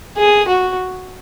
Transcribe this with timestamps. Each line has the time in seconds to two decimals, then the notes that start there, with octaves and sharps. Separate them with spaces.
0.17 G#4
0.48 F#4